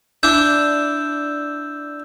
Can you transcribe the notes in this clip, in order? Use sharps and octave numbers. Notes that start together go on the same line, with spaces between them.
D4 E4 E6 G6